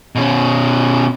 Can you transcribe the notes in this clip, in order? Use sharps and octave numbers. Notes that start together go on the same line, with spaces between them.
B2 C#4